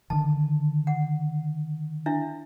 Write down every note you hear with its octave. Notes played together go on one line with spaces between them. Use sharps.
D3 D#3 A5
F#5
D4 E4 E5